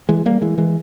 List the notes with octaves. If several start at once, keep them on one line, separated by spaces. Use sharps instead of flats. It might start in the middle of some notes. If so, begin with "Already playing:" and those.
E3 G#3
G3 A#3
E3 G#3
E3 G#3